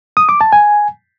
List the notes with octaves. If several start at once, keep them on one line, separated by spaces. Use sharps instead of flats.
D#6
D6
A5
G#5